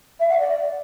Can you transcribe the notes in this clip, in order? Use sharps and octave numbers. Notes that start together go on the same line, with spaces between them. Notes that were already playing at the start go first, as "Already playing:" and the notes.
E5
F#5
D5